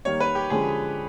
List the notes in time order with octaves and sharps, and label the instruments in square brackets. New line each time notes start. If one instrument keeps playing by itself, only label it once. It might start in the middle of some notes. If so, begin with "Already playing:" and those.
[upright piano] D#3 G3 A#3 [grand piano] C#5
[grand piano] B4
G4
[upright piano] D3 F3 G#3 C#4 [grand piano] G#4